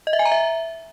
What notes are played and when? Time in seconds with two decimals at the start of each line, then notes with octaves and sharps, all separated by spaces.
0.07 D#5
0.13 E5
0.19 G#5
0.25 A#5
0.32 E5